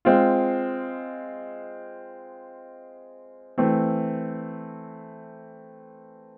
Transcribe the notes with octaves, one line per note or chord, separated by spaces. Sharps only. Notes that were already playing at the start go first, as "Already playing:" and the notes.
G#3 C4 F4
E3 A3 C4